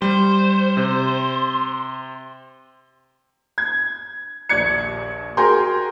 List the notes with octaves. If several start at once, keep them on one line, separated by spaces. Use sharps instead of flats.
G3 C5
C3
G#6
A#1 D#2 A#2 D5 G#6 C#7
F#4 G#4 A#4 G5 C6